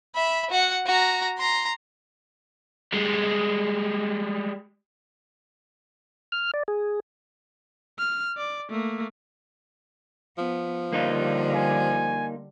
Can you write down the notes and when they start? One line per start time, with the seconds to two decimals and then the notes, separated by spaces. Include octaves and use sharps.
0.15 E5 B5
0.50 F#4 F#5
0.86 F#4 A#5
1.38 A#5 C6
2.93 G3 G#3
6.32 F6
6.54 D5
6.68 G#4
7.99 F6
8.37 D5
8.71 A3 A#3
10.38 F3 B3
10.93 D3 G3 A#3 D#4 F4
11.56 G#5